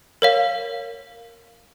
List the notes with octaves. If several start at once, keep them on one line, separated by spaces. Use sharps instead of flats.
A#4 C#5 F5